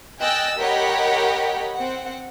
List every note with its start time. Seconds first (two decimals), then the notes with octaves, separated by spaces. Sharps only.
0.19 D#5 G5 G#5 E6 F#6 A6
0.58 G4 A#4 C#5 D#5 F#5 B5
1.75 C4 F#5